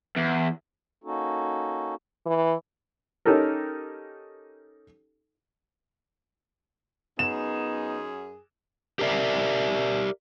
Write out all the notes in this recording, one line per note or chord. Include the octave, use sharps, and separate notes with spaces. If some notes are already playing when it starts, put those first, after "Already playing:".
E2
A#3 C#4 D#4 F#4 A4
E3
C#4 D#4 G4 A4 A#4
F#2 B3 D#4 G#4 E7
G4 A#4 D5 E5